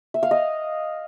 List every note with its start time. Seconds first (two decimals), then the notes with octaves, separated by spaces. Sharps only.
0.14 E5
0.23 F5
0.31 D#5